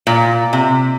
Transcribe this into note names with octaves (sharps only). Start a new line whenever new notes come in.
A#2
C3